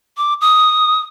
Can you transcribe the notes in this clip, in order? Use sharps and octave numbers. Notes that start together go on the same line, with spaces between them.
D6
D#6